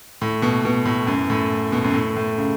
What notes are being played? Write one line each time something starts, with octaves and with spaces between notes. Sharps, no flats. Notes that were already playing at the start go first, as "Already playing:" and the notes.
A2
B2
B2
A2
F#2
A2
B2
F#2
A2
A2
C#3